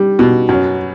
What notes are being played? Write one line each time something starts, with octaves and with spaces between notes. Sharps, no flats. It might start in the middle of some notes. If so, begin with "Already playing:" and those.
Already playing: G3
B2
F#2